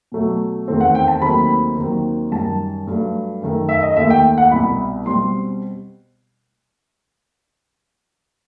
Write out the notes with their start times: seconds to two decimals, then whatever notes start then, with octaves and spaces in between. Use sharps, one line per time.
0.12 B2 F#3 A3
0.68 E2 D#3 A3 C4
0.81 F#5
0.95 G5
1.08 A5
1.22 D#2 D#3 F#3 A3 C4 B5
1.77 D#2 D#3 F#3 C4
2.31 F#2 D#3 G3 A5
2.87 G2 F#3 A3
3.42 F#2 D#3 A3
3.69 E5
3.83 D#5
3.96 D#2 D#3 A3 E5
4.10 G5
4.38 F#5
4.51 C2 B2 G3 B5
5.06 B2 G3 C4 C6